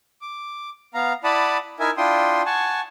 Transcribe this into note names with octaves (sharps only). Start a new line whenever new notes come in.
D6
B3 F5 A#5
E4 D5 F#5 A5 B5 D#6
D#4 E4 A#4 E5 G#5
D4 E4 F4 G5 C6 D#6
F#5 G#5 A5 C#6